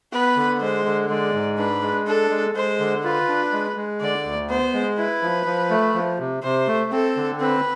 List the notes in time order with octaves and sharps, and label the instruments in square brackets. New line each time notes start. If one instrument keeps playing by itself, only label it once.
[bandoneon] B3 [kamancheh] B4
[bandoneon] D3
[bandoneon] G#3 [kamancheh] C5
[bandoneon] D3
[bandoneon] G#3 [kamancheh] D5
[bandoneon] G#2
[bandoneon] D4 [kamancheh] B4
[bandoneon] G#3
[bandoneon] D4 [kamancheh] A4
[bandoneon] G#3
[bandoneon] G#3 [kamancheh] C5
[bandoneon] D3
[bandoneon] F4 [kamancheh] B4
[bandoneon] D4
G#3
G#3
[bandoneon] D3 [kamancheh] D5
[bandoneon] D2
[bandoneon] B3 [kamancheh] C5
[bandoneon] G#3
[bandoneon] E4 [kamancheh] B4
[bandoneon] F3
F3
A3
F3
C3
[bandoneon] C3 [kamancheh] C5
[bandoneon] A3
[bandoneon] C4 [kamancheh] A4
[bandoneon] D3
[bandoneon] C4 [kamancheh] B4